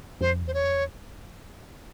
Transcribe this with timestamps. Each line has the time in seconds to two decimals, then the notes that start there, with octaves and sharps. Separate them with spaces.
0.21 F2 C5
0.43 E2 C5
0.54 C#5
0.65 F2
0.76 E2